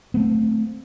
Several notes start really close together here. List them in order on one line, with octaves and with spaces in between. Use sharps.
B3 A3 C4